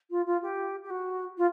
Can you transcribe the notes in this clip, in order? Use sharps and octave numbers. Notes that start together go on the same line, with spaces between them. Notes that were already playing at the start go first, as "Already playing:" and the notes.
F4
F4
G4
G4
F#4
F4